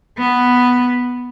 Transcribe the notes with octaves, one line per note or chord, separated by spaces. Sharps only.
B3